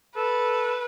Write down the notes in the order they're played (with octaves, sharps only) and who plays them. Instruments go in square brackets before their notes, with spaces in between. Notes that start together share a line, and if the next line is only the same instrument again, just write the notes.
[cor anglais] A4 [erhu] B4